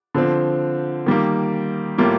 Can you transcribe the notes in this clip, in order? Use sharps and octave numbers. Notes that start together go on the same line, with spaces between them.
D3 F3 C4
D#3 G3 A#3
A2 G3 A#3 F4